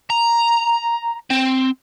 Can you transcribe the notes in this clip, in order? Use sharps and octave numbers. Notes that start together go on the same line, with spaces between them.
A#5
C4